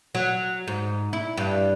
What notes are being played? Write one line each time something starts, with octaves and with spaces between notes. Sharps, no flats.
F#3
G#2
E4
G2